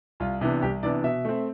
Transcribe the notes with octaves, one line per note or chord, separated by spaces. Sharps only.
C2 F4
C3 E3 B3 D4
C2 G4
C3 E3 B3 D4 D5
B2 E5
A3 C4